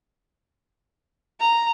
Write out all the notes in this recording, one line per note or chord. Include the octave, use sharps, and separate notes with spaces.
A#5